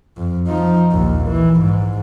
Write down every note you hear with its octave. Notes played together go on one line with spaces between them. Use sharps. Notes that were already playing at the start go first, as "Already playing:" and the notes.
F2
F3 D#4
A#1 D#2
E3
G#2